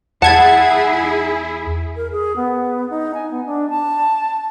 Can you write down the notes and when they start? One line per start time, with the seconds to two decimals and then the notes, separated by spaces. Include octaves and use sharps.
0.22 E2 E4 G#4 F#5 A5 G#6
1.95 A#4
2.12 G#4
2.36 B3
2.90 D#4
3.14 G#5
3.31 B3
3.46 D4
3.70 A5